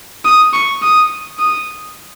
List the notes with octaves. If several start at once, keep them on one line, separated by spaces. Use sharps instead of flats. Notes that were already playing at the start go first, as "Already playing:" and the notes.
D#6
C#6
D#6
D#6